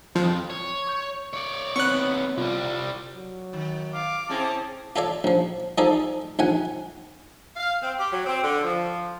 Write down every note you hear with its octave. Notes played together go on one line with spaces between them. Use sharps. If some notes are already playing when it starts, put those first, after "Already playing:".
F2 F3
C#5
C#6 G6
C#5 D5
D#2 B3 C4 C#5 C#6 F#6
C2 G3 F4
F#3
D#3
F5 D6
C4 C#4 E4 G#4 A5
F4 A4 C#5 D5
A#1 F3
F3 D#4 G#4 A4 D5
A#1 D#3 F#5 G#5
F5
C4
G4
F#3
C4
D3
F3